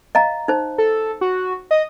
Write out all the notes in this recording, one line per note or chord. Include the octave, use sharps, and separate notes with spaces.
D#5 F5 A#5
D#4 C5
A4
F#4
D#5